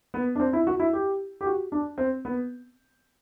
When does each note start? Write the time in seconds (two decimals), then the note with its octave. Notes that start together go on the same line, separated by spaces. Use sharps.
0.14 B3
0.35 D4
0.40 C4
0.53 E4
0.67 F#4
0.80 E4
0.93 G4
1.41 G4
1.46 F#4
1.72 D4
1.98 C4
2.25 B3